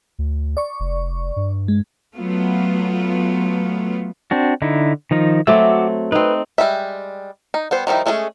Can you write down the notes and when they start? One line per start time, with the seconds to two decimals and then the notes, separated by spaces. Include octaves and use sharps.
0.19 D2
0.57 D5 C#6
0.80 F1
1.36 G2
1.68 G#3
2.16 F#3 A3 B3 F4
4.31 C4 D4 F#4
4.62 D3 D#4 E4
5.11 D#3 F3 D#4
5.47 F#3 A3 C4 F#4 D6 E6
6.12 C4 D#4 B4
6.58 G3 G#3 E5
7.54 D#4
7.71 G3 B3 C5
7.87 D#3 F3 G3 D#4 E4
8.06 G#3 A3 C#4 E4 G#4